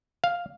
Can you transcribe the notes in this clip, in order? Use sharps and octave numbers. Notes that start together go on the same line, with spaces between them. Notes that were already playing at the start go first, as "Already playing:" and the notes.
F5